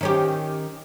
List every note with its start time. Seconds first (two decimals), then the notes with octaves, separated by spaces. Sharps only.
0.01 D#3 C#4 G4